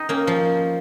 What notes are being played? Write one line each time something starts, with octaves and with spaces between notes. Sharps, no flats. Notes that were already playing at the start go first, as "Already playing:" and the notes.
Already playing: D#4
A#3 C#4
F3